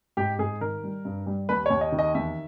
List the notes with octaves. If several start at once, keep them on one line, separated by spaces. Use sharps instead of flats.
G#2 G4
G#2 G#4
D#3 A#4
G3
G2
G3
D#2 B4
D#2 C#5
D#5
D#3
D#5
E2 E5